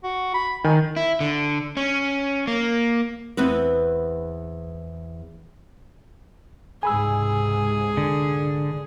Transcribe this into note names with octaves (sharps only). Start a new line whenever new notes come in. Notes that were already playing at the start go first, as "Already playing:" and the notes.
F#4
B5
D#3 G#5
E4
D3
C#4
A#3
E2 B3 C4 B4
C#2 G#2 C3 G#4 G#5 B5 E6
D3